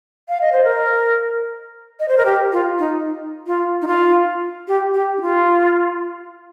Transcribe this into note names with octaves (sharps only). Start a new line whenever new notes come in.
F5
D#5
C5
A#4
D#5
C5
A#4
G4
F4
D#4
F4
D#4
F4
G4
G4
D#4
F4